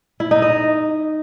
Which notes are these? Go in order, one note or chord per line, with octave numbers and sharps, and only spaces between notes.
E4
D#4
D#5